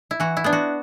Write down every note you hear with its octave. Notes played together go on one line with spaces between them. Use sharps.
E4
E3 F#4
E4
B3 D4
F#4